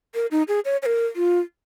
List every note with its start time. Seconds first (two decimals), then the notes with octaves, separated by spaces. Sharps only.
0.15 A#4
0.31 D#4
0.48 G#4
0.65 C#5
0.82 C#5
0.86 A#4
1.16 F4